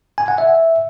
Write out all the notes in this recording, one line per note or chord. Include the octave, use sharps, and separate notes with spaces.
G#5
F#5
E5